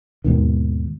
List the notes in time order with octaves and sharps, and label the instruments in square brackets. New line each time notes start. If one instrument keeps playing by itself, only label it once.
[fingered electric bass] D#2 G#2 B2 D#3